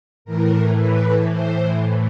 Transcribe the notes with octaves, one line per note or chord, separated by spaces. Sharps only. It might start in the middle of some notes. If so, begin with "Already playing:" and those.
A2 E3 A#4
B4
A2 E3 C5